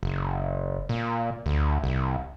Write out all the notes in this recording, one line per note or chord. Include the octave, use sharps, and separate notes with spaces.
F#1
A#2
D2
C2